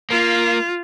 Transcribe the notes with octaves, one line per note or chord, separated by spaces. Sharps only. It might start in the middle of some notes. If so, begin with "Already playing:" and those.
A#3 F4